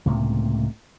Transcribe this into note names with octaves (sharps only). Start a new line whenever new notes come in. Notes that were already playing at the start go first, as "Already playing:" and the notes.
C#2 A2 C3 A#3